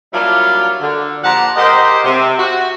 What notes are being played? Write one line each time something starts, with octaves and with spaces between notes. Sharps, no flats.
F#3 G3 A#3 D4 E4 F4
D3
A#2 F3 G4 F#5 A5 A#5
G#3 G4 A#4 C5 D#5 F#5
C3
F#4